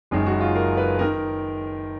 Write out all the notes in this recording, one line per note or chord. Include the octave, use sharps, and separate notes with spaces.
F#1 F#2 D#3 G#3
F#4
F4
A#4
B4
D#3 A#4